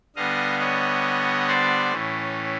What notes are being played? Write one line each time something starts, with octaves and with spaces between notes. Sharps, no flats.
D3 G3 B3 D#5 F5
C#5 D#5
C5 D5
A2 E3 A3 C#4